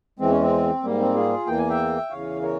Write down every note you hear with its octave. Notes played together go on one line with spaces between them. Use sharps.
E2 E3 G#3 C4
C#4
C4
G#2 G3 A#3
C4
F4 G#4
E2 E3 A#3 G5
G#5
E5 G5
E2 C#3 E3 C#5 F5
A#4 C#5